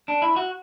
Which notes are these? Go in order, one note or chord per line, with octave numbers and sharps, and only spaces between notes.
D4
E4
F#4